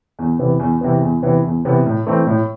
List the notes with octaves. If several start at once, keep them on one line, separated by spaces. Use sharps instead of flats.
E2
C3 E3 B3
E2
C3 E3 B3
E2
C3 E3 B3
E2
C3 E3 B3
A2
E3 A3 C4
A2